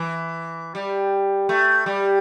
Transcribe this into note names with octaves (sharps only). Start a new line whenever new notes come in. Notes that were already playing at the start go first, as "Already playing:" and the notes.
Already playing: E3
G3
A3
G3